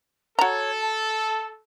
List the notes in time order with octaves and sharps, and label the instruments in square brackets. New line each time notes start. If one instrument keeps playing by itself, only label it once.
[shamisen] F#4 A#5 [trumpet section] A4 [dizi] C#5
[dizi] A5